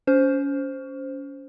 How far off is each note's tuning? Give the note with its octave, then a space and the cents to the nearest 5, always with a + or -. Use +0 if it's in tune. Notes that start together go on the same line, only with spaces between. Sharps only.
C#4 +25 C5 +0